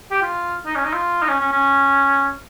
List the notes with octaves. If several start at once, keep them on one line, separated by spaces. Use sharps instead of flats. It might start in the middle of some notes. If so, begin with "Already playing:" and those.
G4
F4
D#4
C#4
D#4
F4
D#4
C#4
C#4
C#4